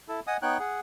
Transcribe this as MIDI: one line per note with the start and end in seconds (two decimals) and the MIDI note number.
0.08 0.20 64
0.08 0.20 69
0.27 0.37 75
0.27 0.37 78
0.27 0.37 80
0.27 0.37 87
0.42 0.58 59
0.42 0.58 63
0.42 0.58 73
0.42 0.58 79
0.42 0.58 90
0.59 0.80 68
0.59 0.80 78